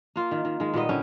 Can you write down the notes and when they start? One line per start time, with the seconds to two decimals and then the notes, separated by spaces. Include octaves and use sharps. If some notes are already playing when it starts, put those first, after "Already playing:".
0.16 A#3 F4
0.31 D#3
0.45 D#3
0.60 D#3 G#3
0.74 A#2 G3 B3 D#5
0.89 D3 G3 C#4